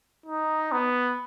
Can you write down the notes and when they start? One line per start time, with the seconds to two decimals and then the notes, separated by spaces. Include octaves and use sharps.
0.26 D#4
0.72 B3